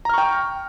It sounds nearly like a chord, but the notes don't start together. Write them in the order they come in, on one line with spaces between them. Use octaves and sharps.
A#5 F6 C#6 G5